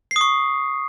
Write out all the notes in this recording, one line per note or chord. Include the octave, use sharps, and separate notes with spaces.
C#6 D#6 C7